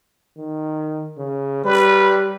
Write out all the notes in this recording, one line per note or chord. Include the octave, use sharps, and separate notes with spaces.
D#3
C#3
G3 B4